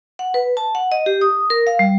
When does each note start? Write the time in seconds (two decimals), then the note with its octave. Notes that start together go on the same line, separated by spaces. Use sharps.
0.19 F#5
0.34 B4
0.57 A5
0.75 F#5
0.92 D#5
1.06 G4
1.21 D#6
1.50 A#4
1.67 F5
1.79 G3